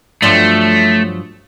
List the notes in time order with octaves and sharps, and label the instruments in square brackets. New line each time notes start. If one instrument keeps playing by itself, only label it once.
[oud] G2 F3 F#3 [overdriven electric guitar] A3